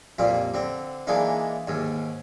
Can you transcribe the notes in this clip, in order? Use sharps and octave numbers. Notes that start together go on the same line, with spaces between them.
F2 A#2 G3 F4
D3 C4
E3 G#3 A#3 D4 D#4
D#2 G#2